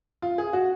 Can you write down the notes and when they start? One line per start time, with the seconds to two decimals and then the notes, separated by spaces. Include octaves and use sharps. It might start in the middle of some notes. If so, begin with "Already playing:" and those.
0.22 F4
0.38 G#4
0.53 F#4